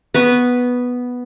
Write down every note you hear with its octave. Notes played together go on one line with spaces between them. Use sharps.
B3 B4 C#6